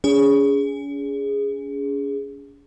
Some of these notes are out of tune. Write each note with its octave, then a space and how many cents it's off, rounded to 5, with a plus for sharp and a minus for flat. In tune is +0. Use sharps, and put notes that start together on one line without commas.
C#4 +40 G#4 -10